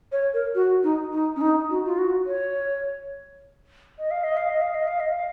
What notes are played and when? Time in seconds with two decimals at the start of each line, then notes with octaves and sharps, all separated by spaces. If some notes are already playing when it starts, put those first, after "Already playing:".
0.12 C#5
0.34 A#4
0.55 F#4
0.83 D#4
1.12 D#4
1.36 C#4
1.41 D#4
1.70 F#4
1.86 F4
1.98 F#4
2.26 C#5
3.99 D#5
4.11 F5
4.24 D#5
4.37 F5
4.49 D#5
4.62 F5
4.75 D#5
4.87 F5
5.00 D#5
5.13 F5